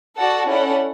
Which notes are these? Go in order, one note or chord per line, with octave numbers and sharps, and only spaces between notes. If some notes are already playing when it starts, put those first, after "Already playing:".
F#4 A4 D5 F#5 A5
C#4 E4 A4 D5 F#5